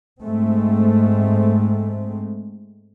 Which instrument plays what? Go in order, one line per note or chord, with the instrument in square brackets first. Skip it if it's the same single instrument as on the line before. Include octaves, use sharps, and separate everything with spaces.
[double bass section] G#2 G#3 A3 C4